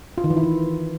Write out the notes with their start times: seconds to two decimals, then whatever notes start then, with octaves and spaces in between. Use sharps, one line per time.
0.18 F4
0.24 D#3
0.30 E3
0.37 E4
0.43 E3